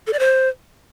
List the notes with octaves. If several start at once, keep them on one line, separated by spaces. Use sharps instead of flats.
A4
D5
C5